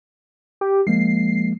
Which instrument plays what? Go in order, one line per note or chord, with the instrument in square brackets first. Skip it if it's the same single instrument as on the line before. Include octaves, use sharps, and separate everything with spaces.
[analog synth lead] G4
[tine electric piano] F3 G#3 A#3 [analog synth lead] C7